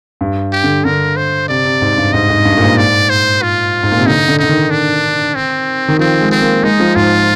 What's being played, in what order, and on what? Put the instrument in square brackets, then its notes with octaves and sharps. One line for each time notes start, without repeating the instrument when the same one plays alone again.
[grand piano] G2
[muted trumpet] G4
[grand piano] D3
[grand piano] D3 [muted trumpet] A#4
[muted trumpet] C5
[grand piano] C3 [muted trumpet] D5
[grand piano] C3
G#2
G2
[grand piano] G#2 [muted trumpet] D#5
[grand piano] G#2
G2
A#2
G#2
[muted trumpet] D5
C5
F4
[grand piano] G#2
A#2
C3
[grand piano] D3 [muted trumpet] D#4
[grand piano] D3
[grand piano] D3 [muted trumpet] D#4
[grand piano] D#3
[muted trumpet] D4
C4
[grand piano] D#3
[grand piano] F3 [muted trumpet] C4
[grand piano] G#3
[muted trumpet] C4
[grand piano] A#3
[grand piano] G#3 [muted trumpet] D#4
[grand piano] F3
[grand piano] G#2 [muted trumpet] F4